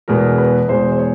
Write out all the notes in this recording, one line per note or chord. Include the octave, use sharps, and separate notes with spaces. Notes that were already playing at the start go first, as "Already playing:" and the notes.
E2 B2 G#3 A#4
B4
E2 B2 G#3 C5
C5
C#5